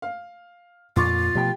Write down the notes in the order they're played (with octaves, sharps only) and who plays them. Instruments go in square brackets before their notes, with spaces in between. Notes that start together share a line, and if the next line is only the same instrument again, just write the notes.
[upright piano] F5
[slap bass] F2 A#2 [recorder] F4 [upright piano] C#6 D6 A6
[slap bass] B2 F3 A3 [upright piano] G4 G5